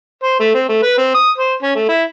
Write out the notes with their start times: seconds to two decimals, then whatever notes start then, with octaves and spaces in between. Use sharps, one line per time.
0.23 C5
0.40 A3
0.54 C4
0.69 A3
0.83 B4
0.98 C4
1.14 D#6
1.38 C5
1.63 C#4
1.75 A3
1.89 E4